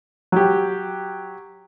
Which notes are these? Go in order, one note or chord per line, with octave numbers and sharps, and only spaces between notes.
F#3 G4